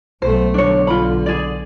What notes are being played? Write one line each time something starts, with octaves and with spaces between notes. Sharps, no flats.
B1 A3 C5
B1 D3 D4 C#5
F4 B5
G#4 D5